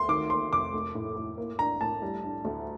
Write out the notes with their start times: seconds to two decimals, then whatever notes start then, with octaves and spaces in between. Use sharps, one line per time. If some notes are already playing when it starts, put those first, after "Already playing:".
Already playing: D2 A#3 C6
0.09 D#3 D6
0.30 A#3 C6
0.52 F1 D6
0.73 A3
0.95 A2
1.16 A2
1.37 A#3
1.59 D4 A#5
1.81 A2 A5
2.02 G3
2.24 D4
2.45 D2